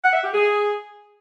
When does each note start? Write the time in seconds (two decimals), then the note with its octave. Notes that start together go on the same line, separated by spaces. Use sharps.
0.03 F#5
0.14 E5
0.24 G4
0.34 G#4